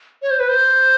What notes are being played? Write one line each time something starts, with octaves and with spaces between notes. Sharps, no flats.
C#5
C5
B4
C5